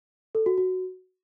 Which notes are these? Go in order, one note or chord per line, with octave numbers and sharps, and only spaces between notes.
A4
F#4
F#4